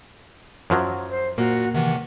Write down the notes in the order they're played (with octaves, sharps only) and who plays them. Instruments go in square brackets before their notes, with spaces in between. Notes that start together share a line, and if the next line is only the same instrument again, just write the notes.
[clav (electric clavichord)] F#2 F3 F#3
[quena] C5
[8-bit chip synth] A#2 [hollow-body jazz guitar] A#3 [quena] F#4
[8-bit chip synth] C3 D#3 E3 [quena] F#5